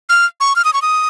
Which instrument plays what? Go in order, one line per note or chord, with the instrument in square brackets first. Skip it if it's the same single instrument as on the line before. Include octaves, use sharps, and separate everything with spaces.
[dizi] F6
C#6
F6
D#6
C#6
D#6